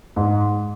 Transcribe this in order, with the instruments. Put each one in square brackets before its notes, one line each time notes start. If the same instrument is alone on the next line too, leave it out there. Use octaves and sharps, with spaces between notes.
[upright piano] G#2